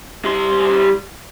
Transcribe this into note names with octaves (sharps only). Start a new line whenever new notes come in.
G3 C6